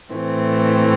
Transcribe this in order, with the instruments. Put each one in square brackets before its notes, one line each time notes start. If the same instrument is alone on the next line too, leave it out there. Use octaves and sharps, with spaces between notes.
[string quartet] A2 E3 A3 C4